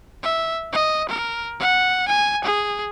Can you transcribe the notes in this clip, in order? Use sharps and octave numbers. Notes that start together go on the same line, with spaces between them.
E5
D#5
A#4
F#5
G#5
G#4